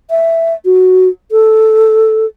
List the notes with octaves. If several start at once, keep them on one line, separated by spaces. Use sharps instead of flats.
E5
F#4
A4